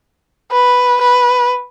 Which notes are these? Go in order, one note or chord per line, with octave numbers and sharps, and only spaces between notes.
B4
B4